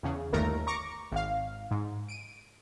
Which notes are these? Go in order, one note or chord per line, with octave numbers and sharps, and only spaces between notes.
E2 C#3
G1 D#2 A3 A#4 A#5
A#5 C#6 D6
G#1 F5
G#2
D7 D#7